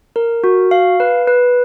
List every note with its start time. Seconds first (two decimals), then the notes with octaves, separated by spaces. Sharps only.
0.16 A#4
0.44 F#4
0.71 F5
1.00 B4
1.28 B4